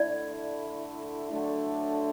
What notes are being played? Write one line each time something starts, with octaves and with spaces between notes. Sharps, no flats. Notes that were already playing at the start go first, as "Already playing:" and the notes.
Already playing: D3 A3 E4 D5
D3 F#3 A3 D4